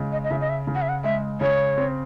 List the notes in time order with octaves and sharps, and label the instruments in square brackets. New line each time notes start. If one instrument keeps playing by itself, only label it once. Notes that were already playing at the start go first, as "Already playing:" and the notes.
Already playing: [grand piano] C#3 G#3
[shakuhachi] D#5
D#5
[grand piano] C#3 [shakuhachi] E5
[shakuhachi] D#5
E5
[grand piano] C#3
[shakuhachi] F#5
E5
F#5
[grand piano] G#3 [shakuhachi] E5
[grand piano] C#3 [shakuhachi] C#5
[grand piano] C4